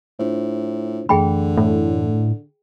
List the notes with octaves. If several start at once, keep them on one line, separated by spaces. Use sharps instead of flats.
A2 D4 F4 C5
F#2 D3 E3 A3 G#4 G5 B5
A2